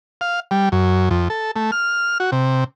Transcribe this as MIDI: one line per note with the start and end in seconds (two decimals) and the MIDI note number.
0.21 0.40 77
0.51 0.69 55
0.72 1.09 42
1.11 1.28 41
1.30 1.51 69
1.56 1.71 57
1.72 2.18 89
2.20 2.31 66
2.32 2.64 48